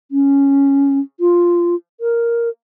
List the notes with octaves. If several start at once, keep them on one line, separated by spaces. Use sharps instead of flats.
C#4
F4
A#4